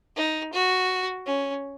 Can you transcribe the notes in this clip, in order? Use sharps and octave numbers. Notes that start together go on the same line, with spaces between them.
D#4
F#4
C#4